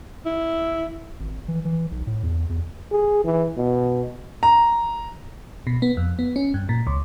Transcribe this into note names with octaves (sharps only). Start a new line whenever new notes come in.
E4
G#1
E3
E3
B1
A2
E2
E2
G#4
E3
B2
A#5
B2
B3
F2
B3
C#4
G2
A#2
C#2